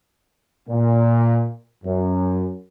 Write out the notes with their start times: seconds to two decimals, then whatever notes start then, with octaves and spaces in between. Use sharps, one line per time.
0.69 A#2
1.84 F#2